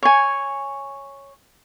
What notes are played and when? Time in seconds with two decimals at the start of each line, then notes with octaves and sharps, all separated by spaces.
0.03 C#5 G#5